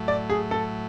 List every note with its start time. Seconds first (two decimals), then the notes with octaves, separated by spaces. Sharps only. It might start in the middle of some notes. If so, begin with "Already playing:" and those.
Already playing: A2 F#3 A3
0.08 D5
0.30 G#4
0.51 A4